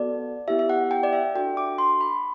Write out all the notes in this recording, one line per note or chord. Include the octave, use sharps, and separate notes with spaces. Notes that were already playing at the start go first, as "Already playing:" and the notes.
Already playing: B3 F#4 A4 D5
B3 E4 G4 E5
E5
F#5
G5
D5
E5
D4 F#4 A4 G5
D6
C6
B5